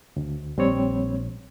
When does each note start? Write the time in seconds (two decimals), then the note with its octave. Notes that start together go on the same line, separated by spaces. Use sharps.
0.16 D2
0.58 A#1 G3 C4 C#5